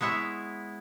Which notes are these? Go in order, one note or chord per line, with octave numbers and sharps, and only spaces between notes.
G#3 B3 E4 C#5 E5